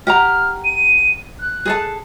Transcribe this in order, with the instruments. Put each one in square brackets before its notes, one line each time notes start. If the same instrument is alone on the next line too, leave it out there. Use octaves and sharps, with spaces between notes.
[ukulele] G4 F#5 A#5 [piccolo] F6
[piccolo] D#7
F#6
[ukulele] G#4 A4 A5